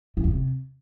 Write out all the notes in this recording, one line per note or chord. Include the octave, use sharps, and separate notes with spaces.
E3
E2
C3